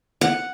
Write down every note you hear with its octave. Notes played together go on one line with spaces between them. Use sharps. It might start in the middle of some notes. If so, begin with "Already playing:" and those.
F#5